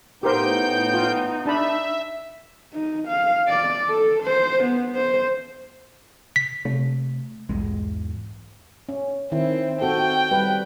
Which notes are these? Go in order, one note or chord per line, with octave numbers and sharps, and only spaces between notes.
A2 B3 D#4 G4 A#4 C5 G5 G6
F4
D4 E5 A5 B5
D#4
F5
D5
A4
C5
B3
C5
B6
C3 A3
B1 E2 G#2 G#3
C#4
D#3 C4 E4
C4 F#4 A4 G5
G3 B4